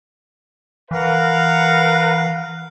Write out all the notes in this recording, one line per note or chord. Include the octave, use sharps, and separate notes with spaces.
E3 A#4 B4 F5 F#5